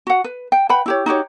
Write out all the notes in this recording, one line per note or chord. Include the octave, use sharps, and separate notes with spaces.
F#4 F#5
B4
G5
B4 F#5 G5 B5
E4 G4 C#5
D#4 F#4 G4 C#5